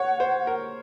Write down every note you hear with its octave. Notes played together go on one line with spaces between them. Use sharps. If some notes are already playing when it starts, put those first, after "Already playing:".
Already playing: C#5 F#5
C5
A#4